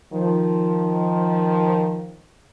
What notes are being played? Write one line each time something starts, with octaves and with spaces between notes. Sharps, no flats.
D#3 F3